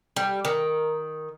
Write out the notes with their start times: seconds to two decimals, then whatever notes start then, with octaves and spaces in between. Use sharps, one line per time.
0.16 G3
0.45 D#3